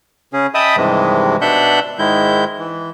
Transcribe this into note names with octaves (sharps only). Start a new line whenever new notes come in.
C#3 C#4 G#4
D#5 E5 G5 A5 B5 D#6
G2 C3 D#3 E3 G#3
B2 D4 E5 F#5 F#6 G6
G#2 D#3 G#3 E4 G6
E3